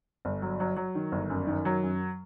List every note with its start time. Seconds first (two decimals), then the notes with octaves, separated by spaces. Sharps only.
0.25 G1
0.42 F#3
0.60 F#3
0.77 F#3
0.95 D#3
1.12 G1
1.30 F#2
1.47 D#3
1.65 F#3
1.83 F#2